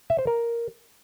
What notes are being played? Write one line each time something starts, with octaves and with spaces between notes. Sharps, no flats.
E5
C5
A#4